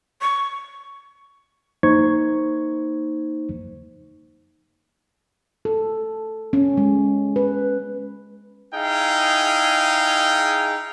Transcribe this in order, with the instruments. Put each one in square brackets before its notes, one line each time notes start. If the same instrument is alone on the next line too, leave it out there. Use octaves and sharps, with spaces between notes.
[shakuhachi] C#6
[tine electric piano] A#3 D#4 C5 C#6 G#6
[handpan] A4
C#4
G#3
B4
[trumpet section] D#4 E4 G#4 F5 G5